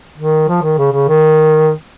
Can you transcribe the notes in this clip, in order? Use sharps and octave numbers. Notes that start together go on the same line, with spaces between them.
D#3
F3
D#3
C#3
C#3
D#3